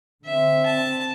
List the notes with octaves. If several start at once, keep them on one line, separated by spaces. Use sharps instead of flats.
D3 C4 E5
A5